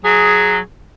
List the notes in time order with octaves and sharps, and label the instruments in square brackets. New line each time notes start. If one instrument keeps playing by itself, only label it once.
[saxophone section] F#3 G#4